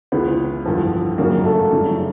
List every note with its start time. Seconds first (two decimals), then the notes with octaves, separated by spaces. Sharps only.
0.12 C#2 C#3 E3 B3 B4
0.66 A1 G2 D3 F3
1.18 G#1 F#2 C#3 F#3 A#3 A#4
1.44 A3 A4
1.71 F#2 C#3 E3 G3